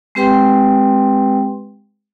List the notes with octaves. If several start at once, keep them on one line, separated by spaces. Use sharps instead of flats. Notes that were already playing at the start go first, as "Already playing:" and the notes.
G#3 C4 G4 B4 G5 C6